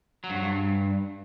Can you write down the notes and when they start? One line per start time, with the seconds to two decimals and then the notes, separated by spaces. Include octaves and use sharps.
0.24 F#3
0.30 G2
0.36 F#3
0.42 G2